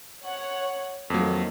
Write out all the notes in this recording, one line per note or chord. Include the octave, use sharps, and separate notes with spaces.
C#5 F#5
F2 D#3 F#3 A3 A#3